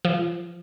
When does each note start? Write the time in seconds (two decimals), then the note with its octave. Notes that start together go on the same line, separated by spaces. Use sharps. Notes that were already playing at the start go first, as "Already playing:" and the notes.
0.05 F3